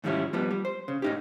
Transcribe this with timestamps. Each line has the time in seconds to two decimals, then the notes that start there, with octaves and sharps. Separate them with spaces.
0.04 G#2 D#3 F3 G3 C#4 E4
0.33 F3 G3 B3
0.51 G3
0.65 C5
0.88 C#3
1.02 A2 D#4 G4